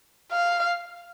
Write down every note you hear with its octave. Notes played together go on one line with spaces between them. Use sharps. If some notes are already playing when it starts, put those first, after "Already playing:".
F5